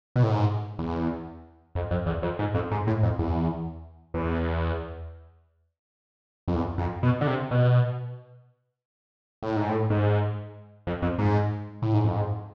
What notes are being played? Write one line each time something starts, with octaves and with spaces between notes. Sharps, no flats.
B2
A2
G#2
E2
F2
F2
E2
F2
G#2
F2
G#2
A2
F2
E2
E2
F2
E2
F2
B2
D3
C3
B2
A2
G#2
A2
G#2
F2
F2
G#2
A2
G#2
F2
G#2